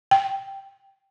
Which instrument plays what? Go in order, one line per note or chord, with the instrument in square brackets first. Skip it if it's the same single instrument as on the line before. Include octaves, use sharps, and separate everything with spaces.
[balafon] G5